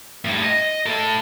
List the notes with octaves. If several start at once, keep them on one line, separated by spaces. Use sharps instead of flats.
A2 G3
D#5
A2 A4